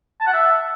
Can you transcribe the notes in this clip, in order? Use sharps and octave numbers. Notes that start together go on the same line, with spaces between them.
A5
F#5
E5